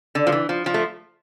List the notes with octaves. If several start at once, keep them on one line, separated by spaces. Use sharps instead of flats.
D3
F3
E3
F3
F3
A3